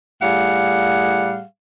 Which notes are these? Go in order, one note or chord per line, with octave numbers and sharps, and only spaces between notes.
A2 G3 G#4 F5 F#5